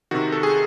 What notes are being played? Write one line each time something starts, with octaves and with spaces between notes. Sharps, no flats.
C3 D#3 F#4
A4
G#4